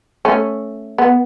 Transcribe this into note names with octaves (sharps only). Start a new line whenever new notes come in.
A3 C#4
B3